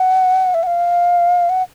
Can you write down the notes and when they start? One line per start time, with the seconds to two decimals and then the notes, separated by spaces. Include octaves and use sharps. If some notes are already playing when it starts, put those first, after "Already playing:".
Already playing: F#5
0.54 E5
0.63 F#5
0.67 F5
1.49 F#5